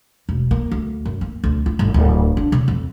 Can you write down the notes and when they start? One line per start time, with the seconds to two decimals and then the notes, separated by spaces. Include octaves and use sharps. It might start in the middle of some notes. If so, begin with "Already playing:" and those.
0.29 E1
0.51 A#3
0.71 D2
1.05 F#2
1.21 A#3
1.44 D2
1.66 F4
1.79 G1
1.94 D1
2.37 D4
2.52 C#3
2.68 F2